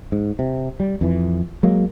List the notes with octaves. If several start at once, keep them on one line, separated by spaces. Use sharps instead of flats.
G#2
C3
G3
F2 E3
F#3 G#3 A#3